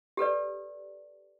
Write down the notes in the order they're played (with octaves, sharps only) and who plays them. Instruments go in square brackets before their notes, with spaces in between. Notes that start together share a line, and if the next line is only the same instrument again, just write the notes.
[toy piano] G4 A4 B4 D5